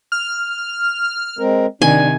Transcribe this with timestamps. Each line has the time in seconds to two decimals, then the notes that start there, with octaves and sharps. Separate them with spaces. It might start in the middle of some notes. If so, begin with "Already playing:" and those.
0.12 F6
1.39 G#3 C4 A#4
1.82 C3 D#3 D4 G#5